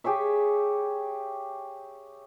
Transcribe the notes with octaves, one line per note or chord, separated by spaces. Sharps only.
G4 G#4 C#5 E5